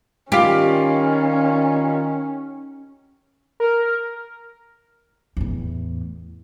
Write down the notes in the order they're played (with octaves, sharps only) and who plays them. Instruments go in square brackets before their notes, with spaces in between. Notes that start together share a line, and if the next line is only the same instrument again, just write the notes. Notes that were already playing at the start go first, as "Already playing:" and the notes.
[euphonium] D#3 [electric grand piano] G3 F4 F5 [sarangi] C#4 [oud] G4
[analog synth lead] A#4
[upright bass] E2 A2